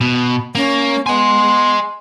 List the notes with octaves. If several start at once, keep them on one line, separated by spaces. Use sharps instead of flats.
B2
A#3 C#4
B3 D#5 G#5 C6